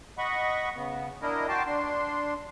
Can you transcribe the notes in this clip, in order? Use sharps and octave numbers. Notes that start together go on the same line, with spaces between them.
D#5 F#5 B5 C#6
C#3 B3
D4 E4 A#4 D#5
F#4 G5 A5 C6 D6
D4 C6